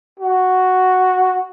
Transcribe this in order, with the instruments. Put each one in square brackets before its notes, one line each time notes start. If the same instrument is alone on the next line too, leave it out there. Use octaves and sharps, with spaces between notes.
[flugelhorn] F#4